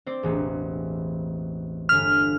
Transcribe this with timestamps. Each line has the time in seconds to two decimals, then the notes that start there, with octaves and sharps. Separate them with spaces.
0.06 C4 C5 D5
0.23 E1 A1
1.89 G1 F6 B6